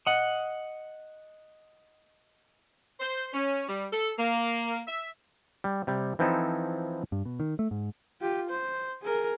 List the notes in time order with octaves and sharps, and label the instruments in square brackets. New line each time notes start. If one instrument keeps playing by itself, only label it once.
[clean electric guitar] D#5 F#5
[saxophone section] C5
C#4
G3
A4
A#3
E5
[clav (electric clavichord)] G3
C3 G3
E3 F3 C4 D#4 E4 A4
[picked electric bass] G2
B2
D#3
A3
G#2
[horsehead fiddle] F4 G4
C5
G#4 A#4